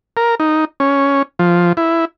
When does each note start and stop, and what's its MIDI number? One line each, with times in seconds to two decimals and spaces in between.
0.17 0.35 70
0.40 0.65 63
0.80 1.22 61
1.39 1.73 53
1.77 2.05 64